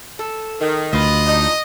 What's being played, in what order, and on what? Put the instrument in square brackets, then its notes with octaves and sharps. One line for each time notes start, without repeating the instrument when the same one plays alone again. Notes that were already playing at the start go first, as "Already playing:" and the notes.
[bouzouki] A4
[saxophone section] D#3
[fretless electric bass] D2 [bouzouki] F4 B4 [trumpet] D#5
[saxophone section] D4 D#4